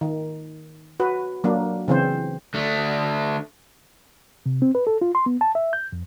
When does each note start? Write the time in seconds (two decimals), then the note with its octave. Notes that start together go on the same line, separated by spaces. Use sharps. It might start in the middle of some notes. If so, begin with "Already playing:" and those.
0.01 D#3
1.00 F#4 B4
1.44 F#3 A#3 D4
1.88 C#3 E3 C4 C5
2.54 D3 A3
4.46 C3
4.62 C4
4.75 B4
4.87 A4
5.01 F4
5.15 C6
5.26 B3
5.41 A5
5.55 E5
5.73 G6
5.92 F2